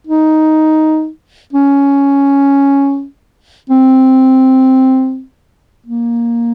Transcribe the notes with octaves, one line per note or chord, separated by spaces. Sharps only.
D#4
C#4
C4
A#3